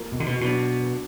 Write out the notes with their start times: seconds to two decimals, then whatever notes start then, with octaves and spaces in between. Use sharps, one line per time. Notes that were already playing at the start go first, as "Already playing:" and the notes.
Already playing: F3 A#3 F4 A#4
0.12 B2
0.20 D3
0.26 B2
0.41 B2 F#3 B3 D4